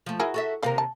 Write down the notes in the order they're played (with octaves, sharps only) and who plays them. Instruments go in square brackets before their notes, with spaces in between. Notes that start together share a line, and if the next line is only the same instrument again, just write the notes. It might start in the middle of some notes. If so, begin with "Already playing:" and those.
[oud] F3 A3
[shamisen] E4 G#4 A#4 [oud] F#4
[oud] F#4 A4 E5
[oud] D#2 C3 A#4 [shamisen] C4 F5
[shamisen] A5